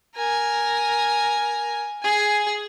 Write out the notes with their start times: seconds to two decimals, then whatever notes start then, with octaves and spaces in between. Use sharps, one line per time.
0.16 A#4 G#5
2.03 G#4 G#5